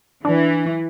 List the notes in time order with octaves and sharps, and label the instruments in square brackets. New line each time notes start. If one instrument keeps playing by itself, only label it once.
[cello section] E3 [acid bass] D4